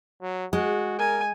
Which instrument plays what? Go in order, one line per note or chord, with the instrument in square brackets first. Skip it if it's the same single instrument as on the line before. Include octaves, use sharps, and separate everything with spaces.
[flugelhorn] F#3
[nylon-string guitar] G#3 [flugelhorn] F#4
[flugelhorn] A#4 [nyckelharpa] G#5